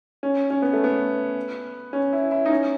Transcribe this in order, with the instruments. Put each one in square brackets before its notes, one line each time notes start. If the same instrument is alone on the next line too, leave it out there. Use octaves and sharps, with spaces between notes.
[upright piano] C#4
C#4
B3
A3
B3
C#4
E4
E4
D#4
C#4